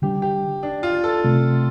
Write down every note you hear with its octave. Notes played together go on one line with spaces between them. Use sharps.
D3 G3 D4 G4
G4
D4
F4
A4
C3 A3 C4